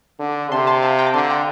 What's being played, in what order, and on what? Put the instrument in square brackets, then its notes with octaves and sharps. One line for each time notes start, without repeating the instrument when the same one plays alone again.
[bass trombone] D3
[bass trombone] C3 [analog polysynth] A5 C6
[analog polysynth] A5 C6
F5 A5
G5 A#5
D6
[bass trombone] D3 [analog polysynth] A5 C6
[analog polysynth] G5 A#5